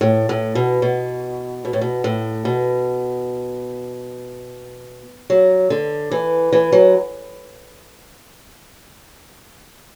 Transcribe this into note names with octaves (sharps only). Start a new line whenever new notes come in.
A2
A2
B2
B2
B2
A2
B2
A2
B2
F#3
D3
E3
E3
F#3